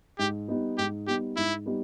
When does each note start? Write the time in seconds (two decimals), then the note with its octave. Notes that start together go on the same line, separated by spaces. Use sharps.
0.19 G#2 G4
0.48 G3 B3 D#4
0.78 G#2 G4
1.07 G3 B3 D#4 G4
1.36 G#2 E4
1.66 G3 B3 D#4